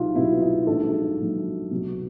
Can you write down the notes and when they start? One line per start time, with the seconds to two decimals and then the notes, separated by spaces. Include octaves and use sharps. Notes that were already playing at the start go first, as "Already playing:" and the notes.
Already playing: C2 B2 F#3 D#4 F4
0.15 C2 B2 F#3 E4
0.41 D#4
0.67 A#1 G#2 D#3 F#3 A4
1.19 A#1 G#2 D#3 F#3
1.71 C2 B2 F#3